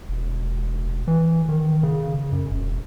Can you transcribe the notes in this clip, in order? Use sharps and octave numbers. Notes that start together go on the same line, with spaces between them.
E1
E3
D#3
C#3
F#2
E1